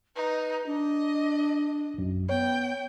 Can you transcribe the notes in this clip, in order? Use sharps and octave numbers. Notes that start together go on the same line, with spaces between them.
D#4 B4
D4 D#5
A#1 F#2
B3 C#5 G5